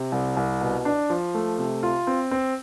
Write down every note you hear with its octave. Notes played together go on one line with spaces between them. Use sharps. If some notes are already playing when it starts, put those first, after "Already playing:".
Already playing: C3
C2
C2
B2
D4
F3
A3
C3
F4
C4
C4